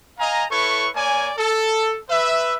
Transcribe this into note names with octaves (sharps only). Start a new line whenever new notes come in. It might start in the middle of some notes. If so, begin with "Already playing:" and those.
D#5 F5 G#5 A#5
E4 A4 B4 C#5 C#6
A#3 C#5 D5 G#5
A4
B4 E5